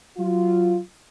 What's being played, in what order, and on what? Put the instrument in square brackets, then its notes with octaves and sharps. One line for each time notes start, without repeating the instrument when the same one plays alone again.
[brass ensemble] F#3 F4